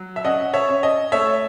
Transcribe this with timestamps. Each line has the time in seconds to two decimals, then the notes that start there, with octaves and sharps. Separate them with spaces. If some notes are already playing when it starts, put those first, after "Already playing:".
Already playing: F#3
0.16 E5
0.24 C#4 D#5 F#5
0.54 C#5 E5
0.68 C#4
0.83 D#5
1.12 A3 C#5 E5